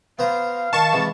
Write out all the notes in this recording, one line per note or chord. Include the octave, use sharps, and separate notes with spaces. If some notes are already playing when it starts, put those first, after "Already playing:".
B3 C5 F5 A#5
D#3 A5 C#6 E7
C3 E3 G#3